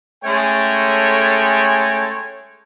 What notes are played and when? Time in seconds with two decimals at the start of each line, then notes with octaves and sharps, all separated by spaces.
0.24 G#3 A3 C#4 A4 C#5 G5